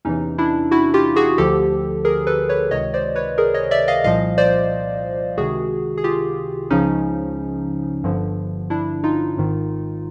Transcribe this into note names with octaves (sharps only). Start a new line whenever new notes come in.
E2 C3 E3 C#4 D#4
D4 E4
E4 F#4
F4 G4
F#4 G#4
D2 D3 F3 G4 A4
G#4 A#4
A4 B4
B4 C#5
C#2 C3 D#3 C#5 D#5
C5 D5
B4 C#5
G#4 A#4
C#5 D#5
D5 E5
D#5 F5
C2 A#2 F3 D#5 F5
C5 D5
C#2 C3 D#3 F#4 G#4
G#4
F4 G4
C#2 C#3 F3 C#4 D#4
G1 G2 D3 F3
D4 E4
D#4 F4
G#1 G#2 D#3